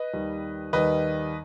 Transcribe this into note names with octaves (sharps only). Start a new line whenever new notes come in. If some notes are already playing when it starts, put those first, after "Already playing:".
Already playing: B4 D#5
D#2 D#3 G3
D#2 D#3 G3 B4 D#5